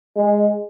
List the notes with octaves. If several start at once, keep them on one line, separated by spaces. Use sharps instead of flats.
G#3